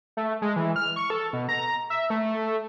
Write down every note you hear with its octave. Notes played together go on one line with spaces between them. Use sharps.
A3
G#3
E3
F6
C#6
A4
B2
A#5
E5
A3